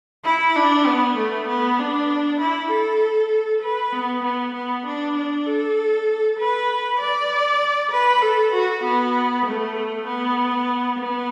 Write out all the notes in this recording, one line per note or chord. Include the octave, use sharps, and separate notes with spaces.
E4
D4
B3
A3
B3
D4
E4
A4
B4
B3
B3
B3
D4
D4
A4
B4
D5
B4
A4
F#4
B3
A3
B3
B3